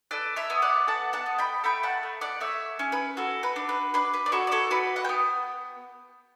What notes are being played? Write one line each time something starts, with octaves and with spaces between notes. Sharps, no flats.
A4 B4 D5
C#5 E5
B3
D5 F#5
A4 F#5 A5
F#5 A5
B3
G5 B5
A3 G5 B5
F#5 A5
A3
D5 F#5
A3 C#5 E5
C#4
B4
F#4 A4
B4
D4
B4
D4 B4
B4
D5
F#4 A4 C#5
D5
A4 C#5
F#4 B4 D5
F#5
G5
B3